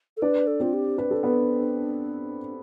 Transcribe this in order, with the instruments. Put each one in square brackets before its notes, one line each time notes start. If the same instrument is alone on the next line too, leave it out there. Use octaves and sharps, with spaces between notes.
[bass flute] A4
[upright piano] D4 D5 [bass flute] B4
[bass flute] A4
[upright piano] C4 C5 [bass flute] F4
[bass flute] G4
[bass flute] D4 [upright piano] B4
[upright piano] A4
B3 B4